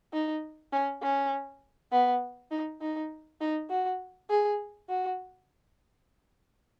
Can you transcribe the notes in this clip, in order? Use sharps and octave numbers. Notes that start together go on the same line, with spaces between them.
D#4
C#4
C#4
B3
D#4
D#4
D#4
F#4
G#4
F#4